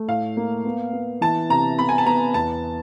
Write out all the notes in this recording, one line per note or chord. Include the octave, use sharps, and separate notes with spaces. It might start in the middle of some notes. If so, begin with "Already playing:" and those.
Already playing: A3
A2 F5
A#3
B3
B3
E3 A5
C3 A#5
B3 B5
G#5
A5
B3 A#5
E2 A5